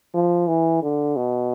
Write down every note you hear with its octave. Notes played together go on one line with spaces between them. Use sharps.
F3
E3
D3
B2